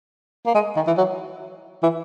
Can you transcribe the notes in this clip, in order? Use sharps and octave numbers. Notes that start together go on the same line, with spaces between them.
A#3
G#3
D#3
E3
F#3
E3